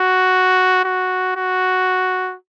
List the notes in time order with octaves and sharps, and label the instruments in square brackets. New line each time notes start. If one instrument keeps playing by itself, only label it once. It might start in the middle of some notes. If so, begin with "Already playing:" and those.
Already playing: [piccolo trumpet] F#4
F#4
F#4